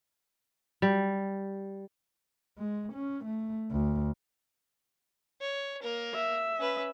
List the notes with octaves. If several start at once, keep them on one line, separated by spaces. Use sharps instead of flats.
G3
G#3
C#4
A3
D2
C#5
A#3 A#4
E5
C#4 B4